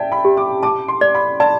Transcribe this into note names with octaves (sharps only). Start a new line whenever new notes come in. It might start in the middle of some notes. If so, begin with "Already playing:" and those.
Already playing: D5 E5 G5 A5
B5
G4
D6
A5 D6
C6
D5
B5
D5 A5